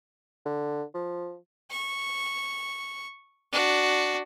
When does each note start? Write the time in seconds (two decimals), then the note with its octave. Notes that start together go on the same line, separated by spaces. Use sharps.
0.46 D3
0.94 F3
1.70 C#6
3.53 D4 F#4